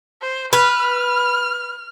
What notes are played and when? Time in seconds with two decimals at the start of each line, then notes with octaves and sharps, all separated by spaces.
0.22 C5
0.53 B4 F6